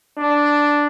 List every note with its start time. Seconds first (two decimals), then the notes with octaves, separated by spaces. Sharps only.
0.17 D4